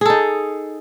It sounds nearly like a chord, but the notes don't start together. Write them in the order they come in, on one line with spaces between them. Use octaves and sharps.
G#4 A4 D#4